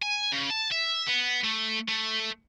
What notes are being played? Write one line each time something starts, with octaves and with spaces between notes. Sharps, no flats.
G#5
C#3
A5
E5
B3
A3
A3